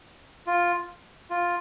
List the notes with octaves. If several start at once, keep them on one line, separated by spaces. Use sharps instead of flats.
F4
F4